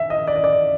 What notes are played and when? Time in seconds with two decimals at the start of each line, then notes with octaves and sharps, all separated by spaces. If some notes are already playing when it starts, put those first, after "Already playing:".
Already playing: E5
0.10 D#5
0.28 D5
0.36 D#5
0.44 D5